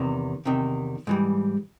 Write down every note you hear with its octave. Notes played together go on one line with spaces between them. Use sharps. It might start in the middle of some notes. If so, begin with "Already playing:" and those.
Already playing: E2 C3 D#3
E2 C3 D#3
G#2 E3 G3